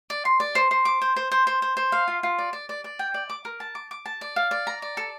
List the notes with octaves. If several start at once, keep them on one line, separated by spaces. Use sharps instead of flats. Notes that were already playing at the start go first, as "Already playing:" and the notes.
D5
C6
D5
C5
C5
D6
C5
C5
C5
C5
C5
C5
F5
F4
F4
D5
D5
D5
D5
G5
D5
D6
A#4
A5
D6
D6
A5
D5
F5
D5
A#5
D5
A4